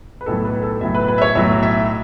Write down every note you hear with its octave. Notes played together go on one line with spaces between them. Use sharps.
B4
B1 A2 F#3 A4
B4
A4
B1 A2 F#3 E5
B4
B4
E5
C#5
B1 A2 F#3 E5
E5